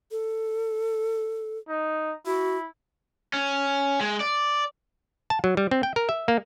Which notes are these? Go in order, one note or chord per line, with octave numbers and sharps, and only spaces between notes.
A4
D#4
E4 F#4
C#4
G#3
D5
A5
F#3
G3
C4
G5
A#4
E5
A#3